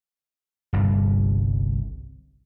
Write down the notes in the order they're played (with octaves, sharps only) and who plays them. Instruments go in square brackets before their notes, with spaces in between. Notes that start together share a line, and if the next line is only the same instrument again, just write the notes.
[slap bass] G1 C2 G2